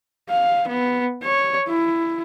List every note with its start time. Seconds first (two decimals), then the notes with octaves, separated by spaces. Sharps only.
0.29 F5
0.68 B3
1.23 C#5
1.69 E4